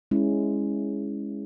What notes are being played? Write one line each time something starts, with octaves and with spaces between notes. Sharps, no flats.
G#3 C#4 E4